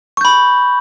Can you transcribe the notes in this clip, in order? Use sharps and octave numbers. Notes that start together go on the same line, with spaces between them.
B5 C#6 G6